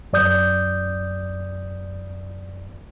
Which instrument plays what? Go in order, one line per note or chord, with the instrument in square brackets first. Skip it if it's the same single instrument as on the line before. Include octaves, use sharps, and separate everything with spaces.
[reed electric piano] F#2 D5 D#6 G6